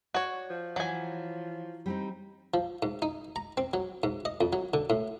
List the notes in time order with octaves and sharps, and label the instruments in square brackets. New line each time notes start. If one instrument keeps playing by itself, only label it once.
[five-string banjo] F#4 C#5 [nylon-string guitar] D5
[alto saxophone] F3
[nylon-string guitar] E3 [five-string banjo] F#3 G#5
[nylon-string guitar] G3 C4 D#4
[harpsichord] F3
G#2
D#4
A#5
C4
F#3
G#2
D#5
F2
F#3
D3
A2